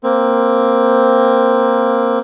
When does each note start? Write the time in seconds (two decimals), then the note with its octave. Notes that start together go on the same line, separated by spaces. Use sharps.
0.03 A#3 C4